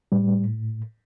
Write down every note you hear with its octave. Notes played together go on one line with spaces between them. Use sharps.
A2 G3